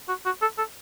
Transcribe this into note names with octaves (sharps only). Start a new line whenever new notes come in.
F#4
F#4
A4
A4